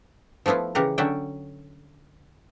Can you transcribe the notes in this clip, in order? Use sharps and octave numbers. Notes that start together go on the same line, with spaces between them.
F3 A3 B3 E4 F4
C#3 E3 G4 A#4 F#5 A#5
D3 F#3 C#4 E5 F#5 G5